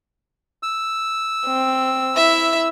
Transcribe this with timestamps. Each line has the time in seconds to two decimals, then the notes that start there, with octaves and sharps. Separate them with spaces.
0.63 E6
1.46 C4
2.16 E4 E5